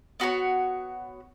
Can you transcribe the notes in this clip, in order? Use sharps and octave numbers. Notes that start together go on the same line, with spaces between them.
B3 F#4 B4 C#5